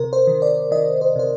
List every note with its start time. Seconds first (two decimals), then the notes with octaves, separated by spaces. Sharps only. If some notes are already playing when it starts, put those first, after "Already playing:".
Already playing: C3 A#4
0.13 C5
0.27 D#3
0.42 D5
0.71 D#3 D#5
1.01 C5
1.16 C3 C5